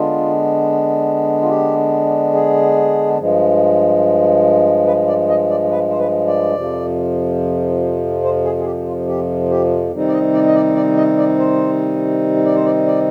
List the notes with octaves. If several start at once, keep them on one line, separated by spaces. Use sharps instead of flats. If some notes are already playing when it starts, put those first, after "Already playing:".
Already playing: D3 G#3 B3 D4 F4
F4
G4
G#4
G2 F3 G#3
B4
D5
D#5
D5
B4
C5
B4
D5
F2 C3 F3
C5
G#4
G#4
G4
F4
G4
G4
C3 D#3 G3 C4 D#4
D5
D#5
D5
D#5
D5
D5
D#5
D5
C5
D5
C5
D5
D5